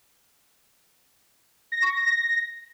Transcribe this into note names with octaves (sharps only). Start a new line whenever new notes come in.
A#6
C#6
A#6